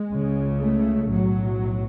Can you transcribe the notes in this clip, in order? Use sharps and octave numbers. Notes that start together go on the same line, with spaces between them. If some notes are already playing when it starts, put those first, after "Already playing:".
Already playing: G#3
C#2 C#3
A3
B1 A2 F#3